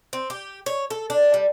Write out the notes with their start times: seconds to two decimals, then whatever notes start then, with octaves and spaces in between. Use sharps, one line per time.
0.13 C4
0.30 G4
0.66 C#5
0.90 A4
1.10 D4
1.34 G3